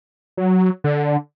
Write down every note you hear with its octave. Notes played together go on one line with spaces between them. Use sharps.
F#3
D3